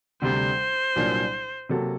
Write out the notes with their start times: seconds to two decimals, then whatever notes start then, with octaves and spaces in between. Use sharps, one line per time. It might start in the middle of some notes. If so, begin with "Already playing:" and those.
0.22 D2 C3 G3 D4 C5
0.96 C2 A#2 F#3 A#3 D4
1.69 C3 F#3 A#3 F#4 A4